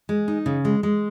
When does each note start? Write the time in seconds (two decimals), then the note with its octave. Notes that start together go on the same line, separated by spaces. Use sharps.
0.09 G#3
0.28 D#4
0.46 C#3
0.65 G#3
0.83 G#3